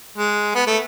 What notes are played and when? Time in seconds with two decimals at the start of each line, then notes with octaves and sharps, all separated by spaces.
0.18 G#3
0.55 B3
0.67 A3